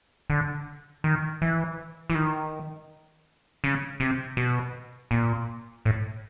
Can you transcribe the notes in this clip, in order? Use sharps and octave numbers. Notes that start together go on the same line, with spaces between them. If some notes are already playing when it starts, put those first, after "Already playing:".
D3
D#3
E3
E3
D#3
C#3
C3
B2
A#2
A2